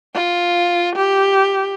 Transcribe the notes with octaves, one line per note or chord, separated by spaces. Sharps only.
F4
G4